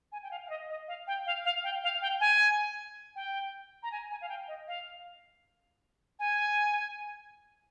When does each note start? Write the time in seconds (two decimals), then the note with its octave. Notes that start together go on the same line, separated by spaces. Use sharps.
0.12 G#5
0.23 G5
0.31 F5
0.46 F5
0.50 D#5
0.70 D#5
0.88 F5
1.07 G5
1.26 F5
1.45 F5
1.64 G5
1.83 F5
2.02 G5
2.20 G#5
3.16 G5
3.83 A#5
3.92 G#5
4.11 G#5
4.22 F5
4.29 G5
4.48 D#5
4.68 F5
6.19 G#5